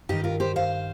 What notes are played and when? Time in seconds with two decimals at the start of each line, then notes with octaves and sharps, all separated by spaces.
0.09 G2 D#3 D#4 G4
0.24 F4 A#4
0.40 G4 C5
0.56 C5 F5